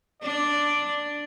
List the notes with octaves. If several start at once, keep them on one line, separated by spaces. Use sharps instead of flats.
D4 D5